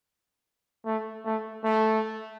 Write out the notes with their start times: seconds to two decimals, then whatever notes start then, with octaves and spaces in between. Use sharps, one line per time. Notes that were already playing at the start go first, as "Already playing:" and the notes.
0.85 A3
1.25 A3
1.64 A3